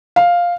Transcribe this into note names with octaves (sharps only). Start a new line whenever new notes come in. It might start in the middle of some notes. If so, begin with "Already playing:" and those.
F5